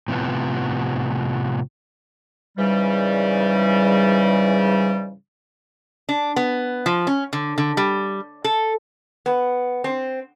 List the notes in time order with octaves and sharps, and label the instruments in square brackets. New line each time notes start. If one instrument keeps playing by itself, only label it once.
[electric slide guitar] A2 C3 F3 B3
[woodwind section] G#2 C#3 E3 G3
[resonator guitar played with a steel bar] D4
B3
F3
C#4
D3
D3
G3
A4
B3
C4